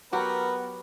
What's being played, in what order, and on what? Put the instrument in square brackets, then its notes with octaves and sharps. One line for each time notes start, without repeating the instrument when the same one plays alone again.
[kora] F#3 F#4 G4 [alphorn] B3 [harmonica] A#4 B4